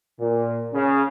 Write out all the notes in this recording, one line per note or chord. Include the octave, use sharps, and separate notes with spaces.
A#2
C#3